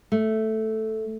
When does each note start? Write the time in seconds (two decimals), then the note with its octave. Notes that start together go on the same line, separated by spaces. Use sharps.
0.12 A3